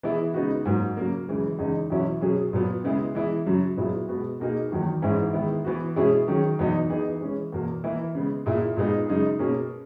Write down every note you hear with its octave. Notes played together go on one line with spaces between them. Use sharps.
E3 B3 E4 G#4
C#3 G#3 B3 D#4 F#4
G#2 F#3 A#3
C#3 F#3 A#3
F#2 C#3 E3 G#3
E2 C#3 G#3 D#4 G#4
E2 B2 F#3 C#4 E4
B2 F#3 C#4 G#4
A#2 F#3 B3
C#3 G#3 B3 E4 G#4
E3 G#3 B3 E4
F#2 C#3 F#3
A#2 F#3 B3 E4 G#4
B2 G#3 B3 F#4
B2 A#3 D#4 G#4
E2 D#3 F#3 A#3
G#2 E3 G#3 C#4 E4
D#3 G#3 B3 E4
E3 B3 F#4
B2 G#3 C#4 E4 G#4
D#3 F#3 C#4 G#4
E2 B2 F#3 B3 D#4
E3 B3 D#4 G#4
E3 G#3 C#4
E2 B2 A#3
E3 A#3 E4
C#3 G#3 B3
A#2 A#3 E4 G#4
A#2 G#3 B3 D#4 G#4
F#2 C#3 G#3 D#4
B2 A#3 C#4 G#4